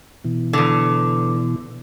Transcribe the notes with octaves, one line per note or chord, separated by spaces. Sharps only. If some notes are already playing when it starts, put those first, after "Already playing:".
B2 E3
E2 D3